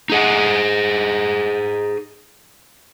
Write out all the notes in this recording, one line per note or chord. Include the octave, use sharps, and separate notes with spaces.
D#4 G#4 F#5